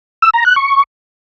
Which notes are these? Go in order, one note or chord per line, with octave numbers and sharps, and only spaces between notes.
E6
A#5
F#6
C#6